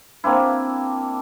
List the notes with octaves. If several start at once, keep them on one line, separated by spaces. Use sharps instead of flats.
A#3 C4 D4 E4